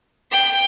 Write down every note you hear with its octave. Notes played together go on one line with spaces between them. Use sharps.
G5